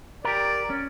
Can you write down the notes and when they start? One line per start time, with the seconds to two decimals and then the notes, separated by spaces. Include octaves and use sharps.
0.24 G4 A#4 D5
0.70 C#4